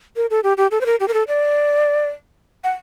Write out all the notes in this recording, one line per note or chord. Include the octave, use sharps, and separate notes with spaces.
A#4
A4
G4
G4
A4
C5
A#4
G4
A#4
A4
D5
F#5